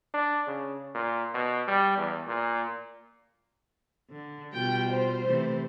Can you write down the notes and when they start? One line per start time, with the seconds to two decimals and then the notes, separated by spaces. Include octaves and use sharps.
0.14 D4
0.47 C#3
0.94 A#2
1.34 B2
1.67 G3
1.97 E2
2.27 A#2
4.10 D3
4.54 B2 G3 F4 G5
4.91 C5
5.28 C3 E3 A3